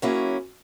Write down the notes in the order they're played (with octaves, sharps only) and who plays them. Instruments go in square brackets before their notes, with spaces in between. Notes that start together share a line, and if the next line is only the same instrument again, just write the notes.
[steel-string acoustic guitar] F#3 A#3 C#4 E4 G#4